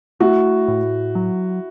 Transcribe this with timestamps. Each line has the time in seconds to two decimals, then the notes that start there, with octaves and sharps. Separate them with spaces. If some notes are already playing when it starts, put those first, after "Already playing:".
0.20 A3 E4 F#4
0.68 A2
1.15 F#3